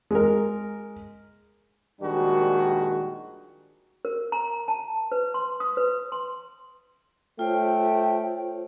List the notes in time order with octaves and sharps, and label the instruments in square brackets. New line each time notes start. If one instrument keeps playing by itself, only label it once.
[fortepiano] G#3 A#4
[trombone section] A#1 D#3 G3 G#3 D4 F#4
[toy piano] A#4
A#5
A5
B4
C6
D#6
B4
C6
[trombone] A3 [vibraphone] F4 C5 C#5 [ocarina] G5